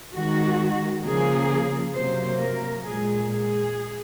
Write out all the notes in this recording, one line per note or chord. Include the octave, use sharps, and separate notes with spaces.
D#3 G#3 F#4
C#3 F3 A#3 G#4
C3 F#3 A#3 C5
A#4
A#2 G#3 G#4
G#4